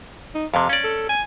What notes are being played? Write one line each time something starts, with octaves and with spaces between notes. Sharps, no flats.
D#4
F2 C3 F5
C#4 D5
A4
G#5